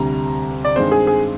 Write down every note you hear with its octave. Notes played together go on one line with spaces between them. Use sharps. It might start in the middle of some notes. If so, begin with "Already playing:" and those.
Already playing: D2 C3 G3 A#5
D5
G2 D#3 G#3 C4 C5
G#4
G#4